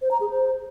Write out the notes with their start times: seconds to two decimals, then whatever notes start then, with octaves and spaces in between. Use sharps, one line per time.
0.02 C5
0.11 A#5
0.21 G#4
0.30 C5